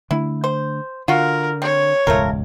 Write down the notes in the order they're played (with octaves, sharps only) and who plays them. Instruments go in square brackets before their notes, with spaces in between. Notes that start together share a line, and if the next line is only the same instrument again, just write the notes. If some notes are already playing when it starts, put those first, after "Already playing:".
[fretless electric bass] D3 A3 D4 [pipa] E4
[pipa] C5
[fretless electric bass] D3 [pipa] F4 F#4 [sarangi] A#4
[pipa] C4 [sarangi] C#5
[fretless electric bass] E1 C#2 G#2 [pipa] A3 F4 A#4